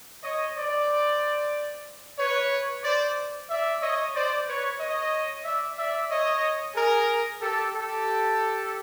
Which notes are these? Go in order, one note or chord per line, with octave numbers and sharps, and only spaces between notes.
C#5 D#5
C5 D5
B4 C#5
C5 D5
D5 E5
C#5 D#5
C5 D5
B4 C#5
C#5 D#5
D5 E5
D5 E5
C#5 D#5
G#4 A#4
G4 A4
G4 A4